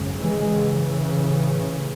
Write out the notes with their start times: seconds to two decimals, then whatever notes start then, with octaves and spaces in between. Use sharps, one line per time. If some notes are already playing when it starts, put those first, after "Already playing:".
Already playing: G#1 F#2 C#3
0.20 E3 G#3
0.49 C#3 E3
1.10 A1 A2